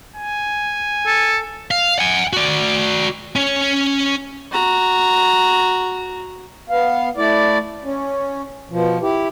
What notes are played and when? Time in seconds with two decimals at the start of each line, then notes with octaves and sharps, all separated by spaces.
0.16 G#5
1.07 A4
1.71 F5
1.99 F#5 G#5
2.33 F#4 D5
3.36 C#4 C#5
4.52 F#4 A#5
6.70 B3 F5
7.17 A3 E4 D5
7.84 C#4
8.70 B2 F3
9.01 E4 G4